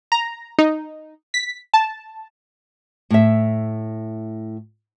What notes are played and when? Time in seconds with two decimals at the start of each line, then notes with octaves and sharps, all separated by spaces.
0.12 A#5
0.59 D#4
1.34 B6
1.74 A5
3.10 A2 E5